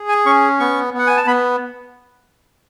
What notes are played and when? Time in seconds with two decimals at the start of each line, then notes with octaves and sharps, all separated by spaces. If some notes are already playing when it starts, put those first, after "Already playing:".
Already playing: G#4
0.09 G#5
0.26 C#4 C#6
0.60 B3 C#6
0.94 B3 F#5
1.07 G#5
1.17 A5
1.27 B3 B5